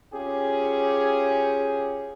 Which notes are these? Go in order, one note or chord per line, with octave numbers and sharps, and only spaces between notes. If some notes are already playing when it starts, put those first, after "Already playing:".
C#4 F4 G4 G#4